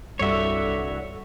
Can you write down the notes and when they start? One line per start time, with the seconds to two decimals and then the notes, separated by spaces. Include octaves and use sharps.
0.19 C2 G2 G3 F#4 A4 C#5 E5